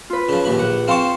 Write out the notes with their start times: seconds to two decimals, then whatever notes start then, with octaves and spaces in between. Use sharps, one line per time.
0.10 F4 B4
0.29 C#3 F3
0.45 A#1 D#2 B5
0.58 A#1 F#5
0.88 C4 F5 A5 C6 C#6